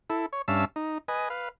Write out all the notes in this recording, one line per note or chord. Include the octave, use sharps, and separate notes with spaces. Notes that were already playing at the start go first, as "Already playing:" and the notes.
E4 A4
C#5
G2 C#4 E5 F5 A5 E6
D#4
B4 D#5 G#5
B4 F5